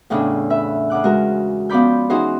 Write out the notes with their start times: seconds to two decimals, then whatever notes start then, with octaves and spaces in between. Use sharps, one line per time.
0.10 E2 A2 C#3 D4
0.50 B4 E5
0.90 C#3 F#5 D6 F#6
1.04 G#3 F#4 A#4
1.69 F3 B3 C#4 D5 B5 G6
2.10 E3 C#4 D#4 F#4 G#4 C5